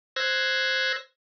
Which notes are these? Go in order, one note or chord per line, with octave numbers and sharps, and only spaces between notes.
C5 E6 F#6 G#6 A#6